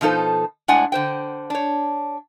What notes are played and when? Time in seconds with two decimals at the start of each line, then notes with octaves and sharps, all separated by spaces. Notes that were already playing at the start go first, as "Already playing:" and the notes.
0.01 B2 F3 D#4 A4 C5
0.68 A2 G#3 D4 D5 F#5 G#5
0.92 D3 C5 G5
1.50 D4 C#5